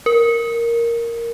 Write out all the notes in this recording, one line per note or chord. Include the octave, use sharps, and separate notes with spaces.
A#4